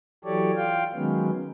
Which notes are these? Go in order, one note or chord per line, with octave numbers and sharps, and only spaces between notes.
E3 F#3 G4 A4 C#5 D5
F4 F5 G5
D#3 F#3 G#3 B3 C#4